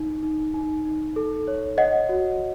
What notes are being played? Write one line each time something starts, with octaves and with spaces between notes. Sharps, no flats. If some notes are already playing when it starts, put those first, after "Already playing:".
Already playing: D#4
D#4
D#4
D#4
A4
C#5
C#5 D#5 F#5
F#4